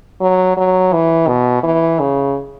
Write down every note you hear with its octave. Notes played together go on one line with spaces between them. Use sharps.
F#3
F#3
E3
B2
E3
C#3